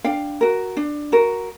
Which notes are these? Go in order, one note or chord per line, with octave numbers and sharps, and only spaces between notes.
D4 F5 G5
F#4 A#4
D4
F#4 A#4